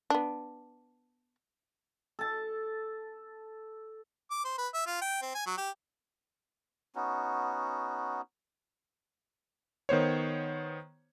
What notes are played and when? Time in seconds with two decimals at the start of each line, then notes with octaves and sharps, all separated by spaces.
0.10 B3 D4
2.19 A4 A5
4.31 D6
4.45 C5
4.58 B4
4.74 E5
4.87 F4
5.01 G5
5.22 C4
5.35 G#5
5.46 F#3
5.58 G4
6.95 B3 C#4 D#4 F#4
9.89 D#3 B3 C5 C#5